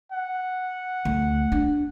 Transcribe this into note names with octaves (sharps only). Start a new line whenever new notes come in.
F#5
D2
D4